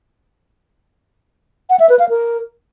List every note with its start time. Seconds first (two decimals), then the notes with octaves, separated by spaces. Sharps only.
1.70 F#5
1.79 E5
1.89 B4
1.99 F5
2.09 A#4